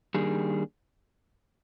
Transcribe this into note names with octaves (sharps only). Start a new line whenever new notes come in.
D#3 G3 A#3 D4 G#4